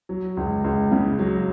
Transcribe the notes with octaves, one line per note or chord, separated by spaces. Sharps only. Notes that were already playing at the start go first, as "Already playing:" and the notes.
F#3
C#2
C#2
C#3
F#3